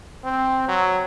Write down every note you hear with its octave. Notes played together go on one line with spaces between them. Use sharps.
C4
F#3